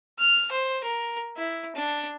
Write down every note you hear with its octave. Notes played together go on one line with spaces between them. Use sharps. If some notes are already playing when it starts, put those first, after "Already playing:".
F6
C5
A#4
E4
D4